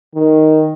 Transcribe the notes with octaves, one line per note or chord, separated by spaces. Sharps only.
D#3